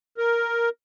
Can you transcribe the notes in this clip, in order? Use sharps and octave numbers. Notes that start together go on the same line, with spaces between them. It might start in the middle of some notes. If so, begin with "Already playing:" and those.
A#4